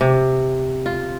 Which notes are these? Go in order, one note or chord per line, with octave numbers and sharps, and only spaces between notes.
C3
F4